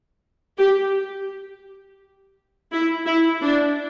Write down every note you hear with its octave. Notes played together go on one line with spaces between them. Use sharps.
G4
E4
E4
D4